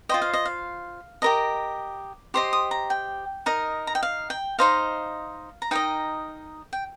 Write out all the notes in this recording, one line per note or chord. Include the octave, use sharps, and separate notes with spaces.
F4 C5 D#5 G5
F5
D#5
F5
G4 A#4 D#5 A#5
G4 C5 D#5 C6
D#6
A#5
G5
D#4 A#4 D#5
A#5
G5
F5
G5
D#4 C5 D#5 F5
A#5
D#4 A#4 D#5 G5
G5